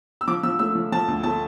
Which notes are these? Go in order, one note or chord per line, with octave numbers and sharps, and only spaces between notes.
E6
F3 D6
F3 E6
A3 E6
F3
F3 A5
D2
A3 A5